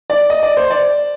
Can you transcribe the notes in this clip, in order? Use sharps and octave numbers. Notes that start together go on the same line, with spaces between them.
D5
D#5
D5
C5
D5